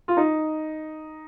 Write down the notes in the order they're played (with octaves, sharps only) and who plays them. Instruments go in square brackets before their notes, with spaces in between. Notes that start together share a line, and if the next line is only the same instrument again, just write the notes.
[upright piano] F4
D#4